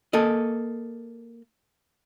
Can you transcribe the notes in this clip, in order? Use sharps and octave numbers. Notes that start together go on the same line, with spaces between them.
A#3 A4 D#5